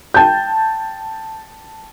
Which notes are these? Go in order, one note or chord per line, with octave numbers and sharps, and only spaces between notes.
G5 A5 G6